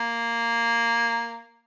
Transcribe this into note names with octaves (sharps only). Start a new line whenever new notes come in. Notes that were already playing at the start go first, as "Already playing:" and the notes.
Already playing: A#3